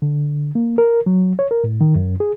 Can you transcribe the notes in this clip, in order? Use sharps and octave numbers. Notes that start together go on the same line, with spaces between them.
D3
A#3
A#4
F#3
C#5
A#4
A2
D#3
F#2
G#4